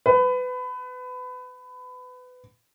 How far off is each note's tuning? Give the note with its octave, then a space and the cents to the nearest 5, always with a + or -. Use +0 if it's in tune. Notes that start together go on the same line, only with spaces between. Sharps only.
B4 +25